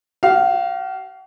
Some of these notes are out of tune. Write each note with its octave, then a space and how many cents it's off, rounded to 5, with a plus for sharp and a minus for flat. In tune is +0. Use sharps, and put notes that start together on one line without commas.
F#4 +45 F5 +0